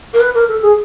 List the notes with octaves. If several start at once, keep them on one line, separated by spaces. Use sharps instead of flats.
A#4
B4
A#4
A4
G#4